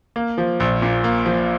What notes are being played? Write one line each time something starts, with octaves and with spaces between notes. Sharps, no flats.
A#3
F3
A#1
A#2
A#3
F3